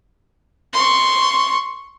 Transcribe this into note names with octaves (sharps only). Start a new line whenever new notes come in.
C6 C#6